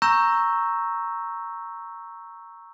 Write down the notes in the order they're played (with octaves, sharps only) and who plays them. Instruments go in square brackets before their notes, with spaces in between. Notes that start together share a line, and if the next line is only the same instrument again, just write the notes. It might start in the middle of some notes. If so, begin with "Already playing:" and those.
[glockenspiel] A#5 C#6 E6 G6 A#6 E7